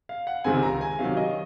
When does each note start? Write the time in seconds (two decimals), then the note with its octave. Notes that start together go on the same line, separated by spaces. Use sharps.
0.09 F5
0.27 F#5
0.44 C#2 C3 D#3 G#3 C4 G#5
0.62 A#5
0.81 G#5
0.99 C3 D#3 F#3 F5
1.17 D#5